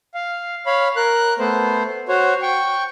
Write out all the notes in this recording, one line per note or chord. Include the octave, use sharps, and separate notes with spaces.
F5
C#5 F5 B5
A#4 F#6
A3 B3 C5
F#4 C5 C#5
G5 C#6